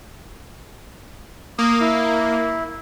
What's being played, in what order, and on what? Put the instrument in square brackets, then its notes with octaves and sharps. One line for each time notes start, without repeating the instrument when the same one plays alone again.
[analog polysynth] A#3 [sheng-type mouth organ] D#6
[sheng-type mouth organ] E4